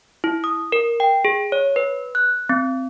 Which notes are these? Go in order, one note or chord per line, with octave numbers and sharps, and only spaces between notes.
E4
D#6
A#4
G5
G#4
C#5
B4
F#6
C4